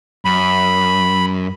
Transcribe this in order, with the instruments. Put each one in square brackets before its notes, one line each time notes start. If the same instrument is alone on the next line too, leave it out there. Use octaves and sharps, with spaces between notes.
[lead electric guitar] F#2 [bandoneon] B5